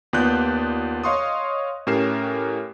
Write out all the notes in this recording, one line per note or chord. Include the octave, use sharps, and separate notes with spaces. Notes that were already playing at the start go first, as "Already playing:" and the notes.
D#2 B3 F4 D5 F#6 G6
C#5 D#5 F5 C6 C#6 D#6
A2 C#4 G4 A#4 C7 E7